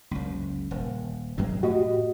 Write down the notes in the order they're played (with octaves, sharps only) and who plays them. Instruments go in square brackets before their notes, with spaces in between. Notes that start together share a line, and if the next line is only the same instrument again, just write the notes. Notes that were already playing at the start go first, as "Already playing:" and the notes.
[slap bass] F#1 C#2
D#1
F#2 F#3 G#3
[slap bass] A2 [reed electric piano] F#4 G4 D#5